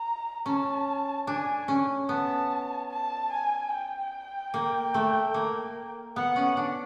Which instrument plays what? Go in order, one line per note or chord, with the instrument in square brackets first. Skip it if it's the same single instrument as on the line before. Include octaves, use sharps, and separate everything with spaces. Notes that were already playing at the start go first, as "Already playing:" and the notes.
Already playing: [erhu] A#5
[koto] C#4 [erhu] A5
[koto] D4 [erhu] G#5
[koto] C#4
[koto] B3 [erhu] A5
[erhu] A5
G#5
G5
[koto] A#3
A3
A#3
[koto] B3 [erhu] F#5
[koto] C#4
D4